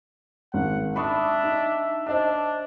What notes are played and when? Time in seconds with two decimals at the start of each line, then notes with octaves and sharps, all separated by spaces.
0.54 G#1 F#5
0.96 D4 E5 B5 C#6 D#6
1.43 D#4
2.06 D4 C5 D#5 E6